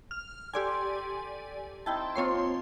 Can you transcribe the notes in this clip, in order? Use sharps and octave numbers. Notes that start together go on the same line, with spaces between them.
F6
G4 A4 C5 D5 G#5 D6
C4 D#4 E4 G5 A5
F3 A#3 C4 F4 C#5 C6